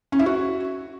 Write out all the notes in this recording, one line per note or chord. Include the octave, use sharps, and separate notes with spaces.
C#4
E4
F#4